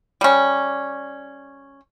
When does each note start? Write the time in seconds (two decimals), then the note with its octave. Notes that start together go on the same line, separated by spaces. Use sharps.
0.21 G3 C#4